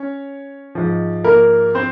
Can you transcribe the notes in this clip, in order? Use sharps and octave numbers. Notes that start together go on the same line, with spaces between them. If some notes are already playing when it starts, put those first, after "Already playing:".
Already playing: C#4 C#5
G#2 F3
A#3 A#4
C4 C5